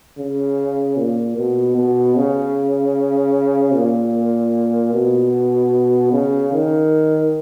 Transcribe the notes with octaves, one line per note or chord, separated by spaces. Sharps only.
C#3
A#2
B2
B2
C#3
A#2
B2
C#3
D#3